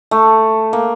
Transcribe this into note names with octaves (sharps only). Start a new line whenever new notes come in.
A3
A#3